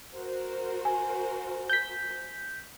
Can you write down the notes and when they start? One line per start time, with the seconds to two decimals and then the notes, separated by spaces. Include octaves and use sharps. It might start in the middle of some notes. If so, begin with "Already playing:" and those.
0.14 F#4 A#4 C5
0.85 G#5
1.70 G6 B6